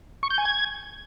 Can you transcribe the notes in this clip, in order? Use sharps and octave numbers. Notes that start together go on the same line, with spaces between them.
C#6
G6
G#5
G#6